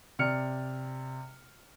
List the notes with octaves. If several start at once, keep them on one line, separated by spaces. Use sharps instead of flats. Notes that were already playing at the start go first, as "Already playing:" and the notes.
C3 D5 F6 C#7